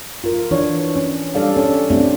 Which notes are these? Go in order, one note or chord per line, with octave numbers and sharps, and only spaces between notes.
F4 A#4
E3 D4 C#5
C#4
G3 D4 A4 D5 F5
C#4 A4
A3 C4 D4 E4 G4